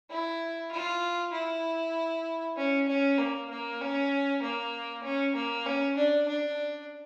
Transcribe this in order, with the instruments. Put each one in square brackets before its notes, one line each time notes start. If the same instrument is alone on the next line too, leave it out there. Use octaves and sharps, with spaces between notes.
[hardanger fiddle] E4
F4
E4
C#4
C#4
A#3
A#3
C#4
A#3
C#4
A#3
C#4
D4
D4